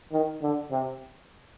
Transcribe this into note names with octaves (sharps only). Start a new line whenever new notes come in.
D#3
D3
C3